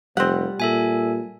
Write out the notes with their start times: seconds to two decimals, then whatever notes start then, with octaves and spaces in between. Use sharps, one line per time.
0.17 F1 G3 C4 F#5 C6
0.60 A#2 A4 E5 G#5